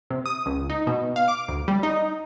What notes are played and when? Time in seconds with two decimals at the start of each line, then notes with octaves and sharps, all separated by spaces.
0.10 C3
0.26 D#6
0.46 C#2
0.70 D#4
0.87 B2
1.16 F5
1.28 D6
1.48 D2
1.68 G3
1.83 D#4